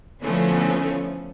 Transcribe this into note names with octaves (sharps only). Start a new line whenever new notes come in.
D3 E3 F3 A3 B3 C#4